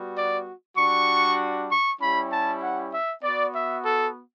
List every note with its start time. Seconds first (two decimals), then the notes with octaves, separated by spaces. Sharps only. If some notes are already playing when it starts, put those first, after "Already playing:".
Already playing: G3 B3 F#4
0.15 D5
0.76 G3 D4 F#4 C#6
1.68 C#6
1.99 G3 C#4 E4 G4 B5
2.30 A5
2.61 F#5
2.91 E5
3.22 B3 F#4 D5
3.53 E5
3.84 A4